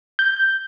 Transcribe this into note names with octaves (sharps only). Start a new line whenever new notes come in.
G6